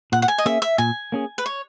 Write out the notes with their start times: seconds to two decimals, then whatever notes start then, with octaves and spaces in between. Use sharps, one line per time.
0.12 A#2 F#5
0.22 F#5
0.28 G#5
0.38 D#5
0.46 A#3 C#4 G#4 E5
0.62 E5
0.78 A#2 G#5
1.12 A#3 C#4 G#4
1.38 B4
1.46 C#5